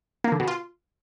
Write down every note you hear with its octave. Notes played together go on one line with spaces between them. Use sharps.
A#3
D3
B2
F4